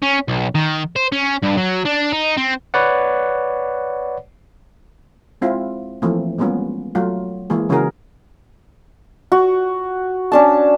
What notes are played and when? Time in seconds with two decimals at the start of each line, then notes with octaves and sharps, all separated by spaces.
0.03 C#4
0.28 B1
0.55 D#3
0.96 C5
1.12 C#4
1.43 G2
1.58 F#3
1.86 D4
2.13 D#4
2.37 C4
2.74 B4 C#5 D5 F#5
5.41 G#3 C4 E4 F4
6.02 E3 F3 A3 A#3 C4
6.38 G3 G#3 A#3 B3 C#4 F4
6.95 F#3 A3 F4
7.50 E3 G#3 A#3 G#4
7.69 C#3 E3 C#4 F#4 G#4 A#4
9.32 F#4
10.32 C#4 D4 A5